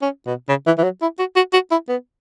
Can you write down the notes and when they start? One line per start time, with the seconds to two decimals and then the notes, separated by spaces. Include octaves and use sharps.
0.02 C#4
0.26 B2
0.49 C#3
0.67 E3
0.78 E3
0.83 F#3
1.02 E4
1.19 F#4
1.36 F#4
1.53 F#4
1.71 E4
1.89 B3